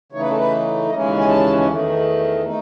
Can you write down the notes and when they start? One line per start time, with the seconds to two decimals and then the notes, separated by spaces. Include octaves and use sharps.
0.12 C#3 E3 A3 D#4 C#5
0.20 B4
0.30 A4
0.38 B4
0.90 D#2 C#3 E3 G#3 C#4 D#5
1.19 G#5
1.29 A5
1.68 E2 D#3 A3
2.45 A3 D#4